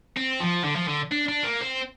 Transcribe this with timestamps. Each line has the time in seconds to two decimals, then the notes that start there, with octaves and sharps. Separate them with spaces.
0.16 C4
0.40 F3
0.64 D3
0.76 F3
0.88 D3
1.12 D4
1.29 D4
1.44 A#3
1.61 C4